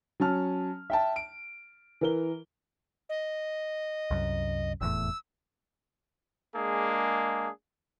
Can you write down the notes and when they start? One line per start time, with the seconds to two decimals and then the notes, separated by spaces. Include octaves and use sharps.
0.20 F#3 C#4 A5 F6
0.90 E5 G5 A5
1.16 D7
2.01 E3 A#4 G7
3.09 D#5
4.11 C2 F#2
4.81 F1 E2 A2 E6
6.55 G#3 A#3 D4 G#4